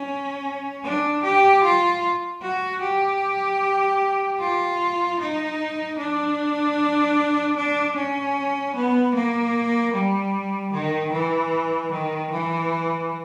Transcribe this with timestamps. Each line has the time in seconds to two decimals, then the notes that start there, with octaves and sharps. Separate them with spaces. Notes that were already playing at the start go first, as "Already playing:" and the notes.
Already playing: C#4
0.84 D4
1.23 G4
1.63 F4
2.42 F#4
2.82 G4
4.40 F4
5.19 D#4
5.98 D4
7.56 D4
7.95 C#4
8.75 B3
9.14 A#3
9.93 G3
10.73 D#3
11.12 E3
11.92 D#3
12.31 E3